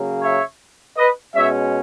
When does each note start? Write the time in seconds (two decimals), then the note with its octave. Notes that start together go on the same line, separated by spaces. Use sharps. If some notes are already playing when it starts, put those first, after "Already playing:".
Already playing: C#3 F#3 A#3
0.22 C#5 E5
0.97 B4 D#5
1.35 B2 G#3 C#4 C#5 E5